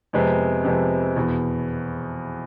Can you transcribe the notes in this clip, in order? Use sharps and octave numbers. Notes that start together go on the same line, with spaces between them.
F2 C3 G#3 B3
F2 C3 G#3 B3
E2 B2 B3